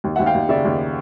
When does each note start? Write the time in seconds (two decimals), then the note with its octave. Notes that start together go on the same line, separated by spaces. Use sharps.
0.04 D#2
0.16 E5 F#5
0.19 D#2
0.26 F5 G5
0.34 D#2
0.49 C#3 D5 E5
0.65 D#2